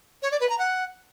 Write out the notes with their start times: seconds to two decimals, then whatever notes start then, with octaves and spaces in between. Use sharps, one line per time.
0.22 C#5
0.31 D5
0.40 B4
0.49 A#5
0.59 F#5